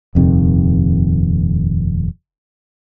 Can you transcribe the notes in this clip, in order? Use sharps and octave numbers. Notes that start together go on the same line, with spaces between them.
D#1 F2 C3 D#3